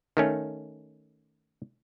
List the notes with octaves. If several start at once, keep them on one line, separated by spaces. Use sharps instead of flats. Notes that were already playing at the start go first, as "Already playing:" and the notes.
D#3 A3 C#4